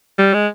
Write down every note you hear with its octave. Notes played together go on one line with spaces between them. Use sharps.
G3
G#3